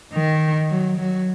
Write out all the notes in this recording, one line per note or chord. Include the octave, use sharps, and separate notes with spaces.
D#3
F#3
F#3